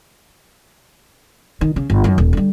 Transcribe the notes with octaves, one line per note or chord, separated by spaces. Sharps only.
D#3
C#3
G1
F#2 D#3
D#1
D3 G3